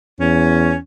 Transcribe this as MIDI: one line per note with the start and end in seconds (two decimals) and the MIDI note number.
0.20 0.76 40
0.20 0.76 61